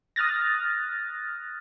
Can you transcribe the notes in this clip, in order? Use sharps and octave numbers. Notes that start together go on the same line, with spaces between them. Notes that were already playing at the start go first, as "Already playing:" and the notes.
D#6 F6 F#6 A6 A#6